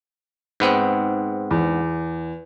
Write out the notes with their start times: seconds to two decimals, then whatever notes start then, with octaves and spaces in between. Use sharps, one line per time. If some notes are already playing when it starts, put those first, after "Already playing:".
0.60 G#2 B3 C4
1.51 E2